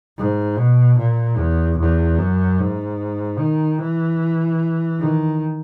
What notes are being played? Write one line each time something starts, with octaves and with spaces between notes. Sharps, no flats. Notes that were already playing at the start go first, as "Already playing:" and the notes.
G#2
B2
A#2
E2
E2
F#2
G#2
D#3
E3
D#3